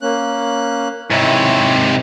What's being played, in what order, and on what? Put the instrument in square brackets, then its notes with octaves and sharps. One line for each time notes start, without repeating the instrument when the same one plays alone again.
[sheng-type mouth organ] A#3 C#4 F#6
[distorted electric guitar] G#2 C3 [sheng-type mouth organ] E4 C#5